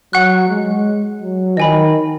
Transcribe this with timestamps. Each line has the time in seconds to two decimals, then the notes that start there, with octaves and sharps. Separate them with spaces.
0.13 F#3 F#5 C#6 F#6
0.50 G#3
1.22 F#3
1.57 D#3 D#5 G#5 B5